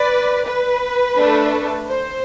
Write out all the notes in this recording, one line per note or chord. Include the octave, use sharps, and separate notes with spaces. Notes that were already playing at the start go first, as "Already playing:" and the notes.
Already playing: B4 D5
B4
A3 D4 A4
C5